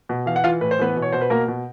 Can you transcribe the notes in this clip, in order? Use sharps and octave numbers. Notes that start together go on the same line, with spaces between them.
B2
E3 F5
F#5
E3 F4 F5
A2 B4
C5
E3 B3 B4
B2
C#5
B2 C5
B4
B2 A#3 A#4
B2